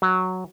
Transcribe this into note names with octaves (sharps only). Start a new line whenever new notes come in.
F#3